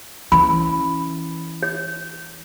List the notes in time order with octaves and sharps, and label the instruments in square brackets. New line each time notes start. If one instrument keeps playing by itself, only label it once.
[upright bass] E3 C#4 [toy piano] B5
[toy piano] C#5